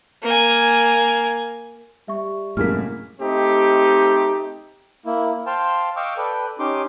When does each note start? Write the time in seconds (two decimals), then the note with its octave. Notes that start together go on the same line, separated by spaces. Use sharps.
0.23 A#3 G#5
2.08 G3 E5 C#6
2.57 F#2 A2 C3 G#3 A#3 F6 B6
3.20 A3 C4 D#4 G4
5.06 A#3 E4
5.46 C5 F5 G5 A5 C6
5.96 D#5 F5 G5 C#6 D6 E6
6.17 A4 B4 D5 G5
6.59 C#4 D#4 G4 C6 D6